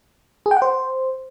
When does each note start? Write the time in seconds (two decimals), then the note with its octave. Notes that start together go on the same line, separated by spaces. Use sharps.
0.46 G#4
0.51 G5
0.57 F#5
0.62 C5